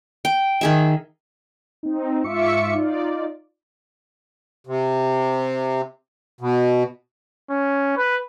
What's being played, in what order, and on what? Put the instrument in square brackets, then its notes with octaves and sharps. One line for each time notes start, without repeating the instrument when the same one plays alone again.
[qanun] G5
D#3 G#4 E5
[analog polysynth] C4 D#4
G#2 F4 E5 C#6 D6 C#7
D#4 F4 D5
[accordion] C3
B2
[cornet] C#4
B4